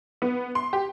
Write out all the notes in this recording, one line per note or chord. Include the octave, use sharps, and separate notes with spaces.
B3
C6
G4